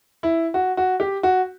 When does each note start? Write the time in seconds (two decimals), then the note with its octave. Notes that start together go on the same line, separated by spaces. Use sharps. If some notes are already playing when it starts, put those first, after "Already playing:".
0.23 E4
0.54 F#4
0.77 F#4
1.00 G4
1.23 F#4